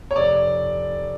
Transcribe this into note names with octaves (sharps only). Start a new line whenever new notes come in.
C#5
F1 D5